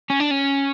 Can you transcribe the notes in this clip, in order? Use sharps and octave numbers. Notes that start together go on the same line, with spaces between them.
C#4
D4
C#4